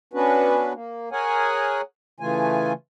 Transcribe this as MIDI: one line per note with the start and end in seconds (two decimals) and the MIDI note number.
0.13 0.73 59
0.13 0.73 61
0.13 0.73 62
0.13 0.73 66
0.13 0.73 71
0.73 1.09 58
1.12 1.81 68
1.12 1.81 70
1.12 1.81 73
1.12 1.81 78
1.12 1.81 80
2.20 2.73 49
2.20 2.73 52
2.20 2.73 57
2.20 2.73 65
2.20 2.73 80